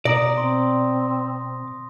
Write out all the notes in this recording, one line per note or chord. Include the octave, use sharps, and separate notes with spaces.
B2 D5 A#5 D#6 A#6
C4 C6